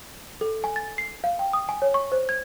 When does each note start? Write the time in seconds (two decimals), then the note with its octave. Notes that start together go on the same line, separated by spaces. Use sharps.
0.41 A4
0.64 G#5
0.76 A6
0.98 C7
1.24 F5
1.39 G5
1.53 D#6
1.69 G#5
1.82 C#5
1.94 C#6
2.12 C5
2.29 G#6